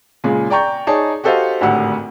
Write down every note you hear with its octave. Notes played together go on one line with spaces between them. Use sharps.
A#2 C#3 G#3
D5 G5 A#5 C#6 G6
D#4 G#4 C#5 D5 A5
F#4 G4 A4 C5 D#5 F5
G#1 D2 A2 G4 F#5 E6